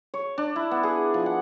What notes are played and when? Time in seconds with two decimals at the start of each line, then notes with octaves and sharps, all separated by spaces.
0.14 C#5
0.38 D4
0.56 E4
0.71 B3
0.83 G#4
1.14 F3
1.26 F#5